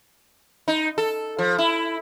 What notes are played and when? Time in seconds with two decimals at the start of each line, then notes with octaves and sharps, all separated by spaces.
0.68 D#4
0.98 A4
1.38 F3
1.58 E4